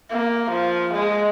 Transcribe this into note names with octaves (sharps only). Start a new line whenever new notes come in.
A#3
F3
G#3